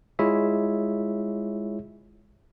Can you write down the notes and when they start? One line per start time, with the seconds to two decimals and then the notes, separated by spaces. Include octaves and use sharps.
0.19 G#3 E4 F4 G#4 C#5 E5